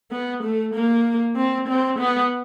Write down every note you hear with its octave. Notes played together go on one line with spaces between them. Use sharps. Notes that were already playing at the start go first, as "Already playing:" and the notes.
B3
A3
A#3
C4
C4
B3